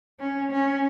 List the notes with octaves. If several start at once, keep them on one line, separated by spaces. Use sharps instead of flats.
C#4
C#4